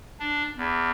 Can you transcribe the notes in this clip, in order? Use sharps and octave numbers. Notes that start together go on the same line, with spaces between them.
D4
E2